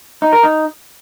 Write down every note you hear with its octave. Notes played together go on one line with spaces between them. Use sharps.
D#4
A#4
D#4